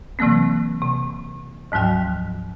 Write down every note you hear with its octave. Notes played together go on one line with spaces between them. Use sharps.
C3 E3 F#3 A#3 C4
C3
D2 G#2 F3 F#3 G5